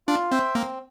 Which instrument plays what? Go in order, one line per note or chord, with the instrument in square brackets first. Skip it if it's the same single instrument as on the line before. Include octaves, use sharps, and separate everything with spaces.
[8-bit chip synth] D4 [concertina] F4
[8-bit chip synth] C4 [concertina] C5 E5 G5
[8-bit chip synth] A#3 [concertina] C4